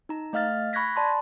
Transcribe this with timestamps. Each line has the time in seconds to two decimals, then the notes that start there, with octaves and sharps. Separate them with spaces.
0.09 D#4 A#5
0.33 A3 D#5 F5 F6 A6
0.73 B5 C#6 F#6 G#6 A#6 B6
0.96 D5 A5 B5 C6